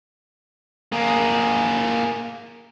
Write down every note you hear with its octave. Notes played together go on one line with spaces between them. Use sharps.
A#3 G#4